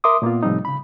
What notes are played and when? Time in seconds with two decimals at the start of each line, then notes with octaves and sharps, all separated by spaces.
0.04 A#4 E5 C6 D6 D#6
0.22 A#2 A#3 B3 F4
0.43 A2 C3 F3 G3 C4 D#4
0.65 C#3 B5